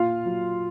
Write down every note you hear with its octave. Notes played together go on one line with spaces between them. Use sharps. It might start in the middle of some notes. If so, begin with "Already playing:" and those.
Already playing: A#2 F4 F5
F#3